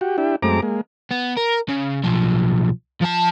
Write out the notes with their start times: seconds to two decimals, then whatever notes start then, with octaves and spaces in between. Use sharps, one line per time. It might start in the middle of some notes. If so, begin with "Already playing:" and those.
0.01 F#4 G4
0.18 D4 E4 G4
0.42 F#2 G#3 A3 C4 A#5 D6
0.62 G#3 A#3
1.11 B3
1.37 A#4
1.69 C#3
2.03 B1 F3
3.01 F3 A5